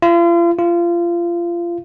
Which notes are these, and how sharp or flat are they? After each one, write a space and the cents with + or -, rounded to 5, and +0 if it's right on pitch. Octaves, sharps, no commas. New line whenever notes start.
F4 -40
F4 -25